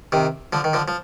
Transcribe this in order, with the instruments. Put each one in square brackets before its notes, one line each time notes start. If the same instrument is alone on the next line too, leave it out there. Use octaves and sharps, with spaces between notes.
[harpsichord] C3 D#3
D3 F3
D#3
D3 F3
F3